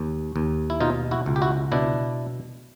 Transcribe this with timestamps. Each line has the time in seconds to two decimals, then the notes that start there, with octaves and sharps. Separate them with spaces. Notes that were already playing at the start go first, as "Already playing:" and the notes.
Already playing: D#2
0.36 D#2
0.70 E4
0.80 B2 D#4 F4
1.11 E4 F#4
1.26 C#2
1.36 G4
1.42 E4 F#4
1.72 B2 D4 E4